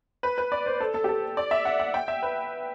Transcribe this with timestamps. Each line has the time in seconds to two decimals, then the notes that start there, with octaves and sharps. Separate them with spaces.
0.23 B4
0.38 B4
0.52 D5
0.66 C5
0.80 A4
0.94 A4
1.04 G4
1.09 A4
1.37 D5
1.51 E5
1.65 F#5
1.79 F#5
1.94 G5
2.08 E5
2.23 B4